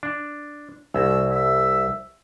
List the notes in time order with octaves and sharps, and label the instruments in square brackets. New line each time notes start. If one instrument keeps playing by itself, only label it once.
[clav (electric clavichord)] D4
[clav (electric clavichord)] C2 [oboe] E6
[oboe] E5